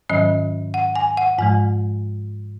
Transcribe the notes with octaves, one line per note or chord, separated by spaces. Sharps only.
G#2 D#3 F#3 C#4 D#5
F#5
G#5
F#5
G#2 F3 G#3 G#5